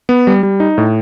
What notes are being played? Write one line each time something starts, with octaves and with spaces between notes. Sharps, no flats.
B3
G3
G3
D#4
A2